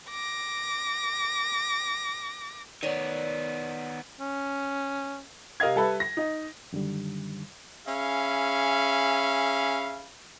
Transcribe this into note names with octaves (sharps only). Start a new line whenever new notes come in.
D6 A#6
D#3 B3 C#5 D5
C#4
C3 A#4 D#5 F5 G#6
G3 A4 B4 E5
A#6
D#4 D#5
F#2 D3 D#3 G3
C#4 G#4 E5 F5 G#5 B5